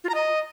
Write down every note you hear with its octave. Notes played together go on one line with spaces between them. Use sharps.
F4
A#5
D#5